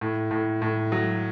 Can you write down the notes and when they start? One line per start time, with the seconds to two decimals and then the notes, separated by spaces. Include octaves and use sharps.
0.01 A2
0.31 A2
0.62 A2
0.92 F#3